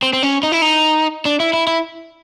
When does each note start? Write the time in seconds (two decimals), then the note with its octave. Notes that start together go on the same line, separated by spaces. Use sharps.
0.03 C4
0.13 C4
0.23 C#4
0.43 D#4
0.52 E4
0.62 D#4
1.25 D4
1.40 E4
1.53 E4
1.67 E4